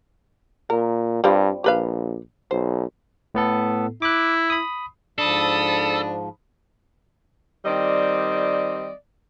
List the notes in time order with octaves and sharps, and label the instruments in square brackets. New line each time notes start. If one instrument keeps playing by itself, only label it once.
[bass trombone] A#2 [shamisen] A#4
[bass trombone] G2 [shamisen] G3 C4 F4
[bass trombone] A#1 [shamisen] G4 B4 F5
[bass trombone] B1 [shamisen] C5
[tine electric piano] A2 B3 A4
[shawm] E4 [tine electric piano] D6 F#6
[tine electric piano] B5 D#6
[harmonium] G#2 F3 [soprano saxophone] D4 [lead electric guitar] A4 [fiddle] B5 D#6
[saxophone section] D#3 G3 C4 D5 D#5